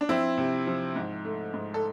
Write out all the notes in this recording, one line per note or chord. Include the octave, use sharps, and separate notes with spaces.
D4
F3 C4 E4
C3
F3
G#2
A3
G#2
A4